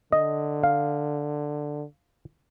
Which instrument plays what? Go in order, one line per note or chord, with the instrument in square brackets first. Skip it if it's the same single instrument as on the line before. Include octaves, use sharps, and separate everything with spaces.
[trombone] D3 [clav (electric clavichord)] D#5
[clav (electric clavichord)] F5